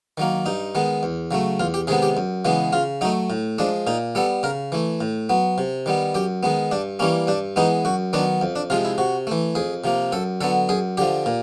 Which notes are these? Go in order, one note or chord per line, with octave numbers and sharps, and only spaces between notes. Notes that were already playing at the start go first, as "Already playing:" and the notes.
D#3 F#3 A#3
G2 D#4
D#3 G#3 B3
E2
C#3 F#3 A3
E2 F4
G4
C3 D#3 G#3 B3 G#4
G4
F#2
C#3 E3 G#3 B3
C#3 F4
F#3 A3 D#4
A2
F3 G#3 D4
A#2 D#4
G3 B3 A4
C#3 A#4
E3 A3
A2
F#3 B3
C3
D#3 G3 B3
F#2 G4
D#3 G#3 B3
G2 D4
E3 G3 A#3 C#4
G2 D4
E3 G#3 B3 D#4
F#2 F#4
D#3 F#3 B3 D4
F2
D4
C3 F3 G#3 F4
E4
C3 F#4
E3 A3
F2 G#4
C3 F3 A#3
F#2 A4
D3 F#3 B3 A4
F#2 G#4
D3 F3 G4
A#2